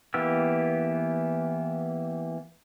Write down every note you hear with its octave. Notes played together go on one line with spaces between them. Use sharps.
E3 A#3 B3 G4 E6